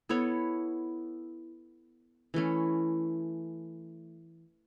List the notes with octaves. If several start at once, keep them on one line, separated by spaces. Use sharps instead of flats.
B3 E4 A4 C#5
E3 A3 C#4